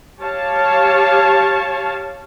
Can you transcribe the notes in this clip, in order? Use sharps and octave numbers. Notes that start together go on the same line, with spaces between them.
G4 C#5 F5 A5